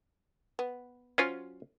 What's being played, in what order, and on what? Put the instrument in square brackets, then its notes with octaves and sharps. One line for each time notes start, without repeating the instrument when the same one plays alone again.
[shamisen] B3
[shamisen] F#3 C5 G#5 [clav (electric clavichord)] C#4 F4